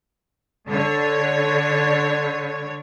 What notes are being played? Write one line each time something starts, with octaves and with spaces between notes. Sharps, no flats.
D3 C#5